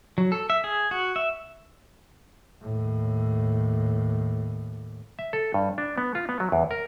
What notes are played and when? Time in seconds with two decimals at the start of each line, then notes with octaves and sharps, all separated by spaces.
0.18 F#3
0.32 A4
0.50 E5
0.64 G#4
0.91 F#4
1.16 E5
2.61 D#2 A2
5.19 E5
5.33 A4
5.54 G2
5.78 D4
5.98 B3
6.15 F4
6.29 B3
6.40 F#3
6.52 E2
6.71 A#4